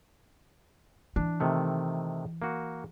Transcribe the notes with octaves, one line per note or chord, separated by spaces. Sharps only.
E3 D4
C3 D#3 A3
A#3 F#4